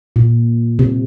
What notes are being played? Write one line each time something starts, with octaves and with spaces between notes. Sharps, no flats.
A#2
C3